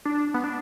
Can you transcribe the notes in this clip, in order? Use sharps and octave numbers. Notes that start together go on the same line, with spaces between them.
D4
B3
D4